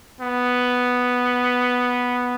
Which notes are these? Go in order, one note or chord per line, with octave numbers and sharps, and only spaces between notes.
B3